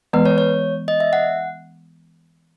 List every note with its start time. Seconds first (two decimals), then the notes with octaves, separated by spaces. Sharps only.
0.13 E3 G#3 B3 B4
0.25 C#5
0.38 C#5
0.88 D#5
1.00 E5
1.13 F#5